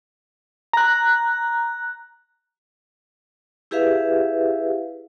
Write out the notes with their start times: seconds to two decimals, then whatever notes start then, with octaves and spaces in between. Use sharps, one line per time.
0.73 A#5 F#6
3.71 E4 G4 G#4 B4 E5 F5